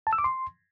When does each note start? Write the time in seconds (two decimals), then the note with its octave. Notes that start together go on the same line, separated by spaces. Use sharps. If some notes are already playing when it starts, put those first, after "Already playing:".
0.07 A5
0.13 E6
0.18 D6
0.24 C6